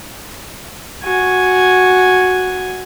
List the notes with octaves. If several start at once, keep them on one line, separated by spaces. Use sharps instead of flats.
F#4 G#5